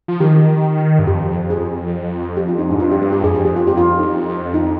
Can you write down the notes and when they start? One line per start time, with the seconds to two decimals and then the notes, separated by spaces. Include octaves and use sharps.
0.08 F3
0.20 D#3 G4
0.99 G2
1.07 F2 G4
1.50 G#4
2.37 G4
2.48 F4
2.59 D#4
2.70 G#2 D4
2.80 G2 F4
2.92 G4
3.02 G4
3.13 G4
3.23 F2 G#4
3.35 G#4
3.45 G4
3.56 F4
3.67 G4
3.77 F4
3.99 D#4
4.54 D#4